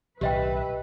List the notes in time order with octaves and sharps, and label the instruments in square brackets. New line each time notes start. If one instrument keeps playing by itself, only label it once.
[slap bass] B1 A2 D#3 [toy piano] G4 D#5 G5 [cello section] B4 E5